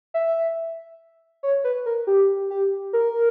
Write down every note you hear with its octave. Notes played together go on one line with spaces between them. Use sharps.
E5
C#5
B4
A#4
G4
G4
A#4